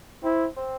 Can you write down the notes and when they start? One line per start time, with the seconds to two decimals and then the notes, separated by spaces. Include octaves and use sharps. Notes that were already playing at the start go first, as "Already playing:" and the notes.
0.23 C4 E4
0.57 C4